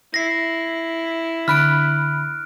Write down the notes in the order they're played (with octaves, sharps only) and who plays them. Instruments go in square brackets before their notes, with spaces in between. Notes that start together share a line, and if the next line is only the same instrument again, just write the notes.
[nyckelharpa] E4 [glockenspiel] A#6 C7
[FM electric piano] D3 B5 [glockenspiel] F6 F#6 D7